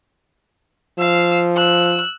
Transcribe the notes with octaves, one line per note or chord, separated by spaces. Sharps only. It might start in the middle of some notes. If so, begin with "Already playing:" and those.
F3 F5 E6
E6 F#6